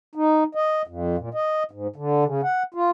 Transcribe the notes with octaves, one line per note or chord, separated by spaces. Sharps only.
D#4
D#5
F2
A#2
D#5
G#2
D3
C#3
F#5
F4